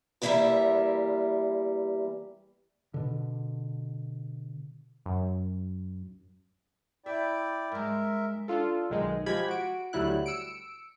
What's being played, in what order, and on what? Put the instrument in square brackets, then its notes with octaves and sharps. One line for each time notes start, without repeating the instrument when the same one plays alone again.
[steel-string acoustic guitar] E2 E3 G3 A#3 A#4 E5
[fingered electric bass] B2 D3
[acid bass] F#2
[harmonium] E4 D5 G5 [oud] E5
[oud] G#2 G#3 [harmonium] A#4 E5
[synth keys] D4 F4 A4
B1 D#3 G#3
F3 G#3 G4 B5 G#6
F#4 D7
D2 F#3 G3 E4 F#6
E6 C#7 D7